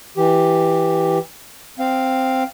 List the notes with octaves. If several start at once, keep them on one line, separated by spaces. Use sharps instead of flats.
E3 G4
C4 F5